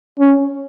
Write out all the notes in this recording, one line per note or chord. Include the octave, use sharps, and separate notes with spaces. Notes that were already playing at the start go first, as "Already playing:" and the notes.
C#4